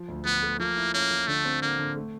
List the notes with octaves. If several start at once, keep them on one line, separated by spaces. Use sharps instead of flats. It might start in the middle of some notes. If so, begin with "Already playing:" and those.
Already playing: F3
D2
F3 B3
A3
F3 A#3
E4
A#3 C#4
F3
D3 A3
C4
D3 A#3
D3
A3